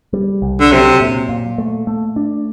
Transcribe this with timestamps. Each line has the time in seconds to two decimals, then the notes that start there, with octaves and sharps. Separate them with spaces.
0.13 G3
0.42 C2
0.60 D3
0.72 C3 F#3
1.01 A#2
1.29 A#2
1.58 A3
1.87 A3
2.16 D4